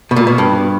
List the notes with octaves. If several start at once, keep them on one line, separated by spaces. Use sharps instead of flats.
B2
A#2
B2
G2